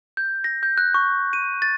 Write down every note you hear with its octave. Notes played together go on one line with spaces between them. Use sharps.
G6
A#6
G6
F#6
C#6
D#7
A6